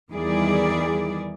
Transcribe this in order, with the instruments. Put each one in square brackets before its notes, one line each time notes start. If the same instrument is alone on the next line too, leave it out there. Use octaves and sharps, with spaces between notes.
[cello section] E2 D#3 G3 E4 G#4 D5